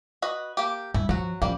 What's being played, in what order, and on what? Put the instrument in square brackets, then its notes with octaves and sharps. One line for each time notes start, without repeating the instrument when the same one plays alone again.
[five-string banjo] F#4 B4 D#5
A#3 G4
[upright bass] G2 [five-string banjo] E4
[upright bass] F3 [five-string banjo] F#3 F#4
[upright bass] F3 C#4 [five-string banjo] G3 A#3